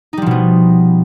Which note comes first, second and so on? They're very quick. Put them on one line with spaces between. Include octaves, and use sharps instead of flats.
D#4 G3 F3 B2 B3